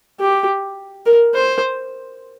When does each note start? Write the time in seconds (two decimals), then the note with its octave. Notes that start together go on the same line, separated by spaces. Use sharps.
0.20 G4
1.06 A#4
1.35 C5